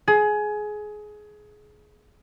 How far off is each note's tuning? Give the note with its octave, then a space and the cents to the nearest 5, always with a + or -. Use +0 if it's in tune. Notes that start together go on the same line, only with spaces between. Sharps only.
G#4 +20